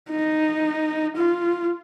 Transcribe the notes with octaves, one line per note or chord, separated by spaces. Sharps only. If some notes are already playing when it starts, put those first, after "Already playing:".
D#4
F4